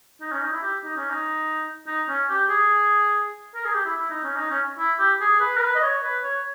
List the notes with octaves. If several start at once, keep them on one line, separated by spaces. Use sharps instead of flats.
D#4
C#4
D#4
E4
G4
D#4
C#4
D#4
D#4
C#4
G4
G#4
A#4
G#4
G4
E4
E4
D#4
C#4
D#4
C#4
E4
G4
G#4
B4
A#4
B4
D#5
C#5
B4
C#5